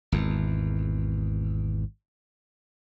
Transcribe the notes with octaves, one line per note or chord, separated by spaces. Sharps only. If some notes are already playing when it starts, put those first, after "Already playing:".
G#1 E2